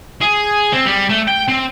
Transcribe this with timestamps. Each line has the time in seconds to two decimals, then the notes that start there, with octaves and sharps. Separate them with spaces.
0.21 G#4
0.73 C4
0.86 G3
1.09 A3
1.28 G5
1.49 C4